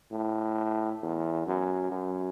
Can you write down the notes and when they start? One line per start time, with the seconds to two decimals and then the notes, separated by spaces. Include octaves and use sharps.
0.12 A2
1.03 E2
1.47 F#2
1.91 F#2